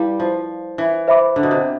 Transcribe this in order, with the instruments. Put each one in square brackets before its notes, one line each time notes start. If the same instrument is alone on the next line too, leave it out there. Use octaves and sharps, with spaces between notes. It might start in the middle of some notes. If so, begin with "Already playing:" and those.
Already playing: [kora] G3 [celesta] E4 B4 D5 F5
[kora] F3
E3
[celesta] C5 E5 B5 D6
[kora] D3
B2
C3